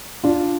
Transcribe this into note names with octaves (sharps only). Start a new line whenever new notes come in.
D4 F4